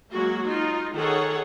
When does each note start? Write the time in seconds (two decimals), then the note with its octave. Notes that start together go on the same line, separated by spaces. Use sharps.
0.11 F#3 G#3 A#3 F#4
0.47 D#4 F4
0.93 D#3 G#4 A4 C#5 F#5